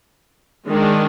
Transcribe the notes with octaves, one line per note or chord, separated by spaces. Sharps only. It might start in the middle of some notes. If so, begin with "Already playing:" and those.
D#3 G#3 D4